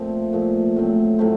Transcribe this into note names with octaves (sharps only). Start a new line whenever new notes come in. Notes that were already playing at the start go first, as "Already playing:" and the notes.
Already playing: A#2 F3 A3 C4
A#2 F3 A3 C4
A2 F#3 A3 C4
A2 F#3 A3 C4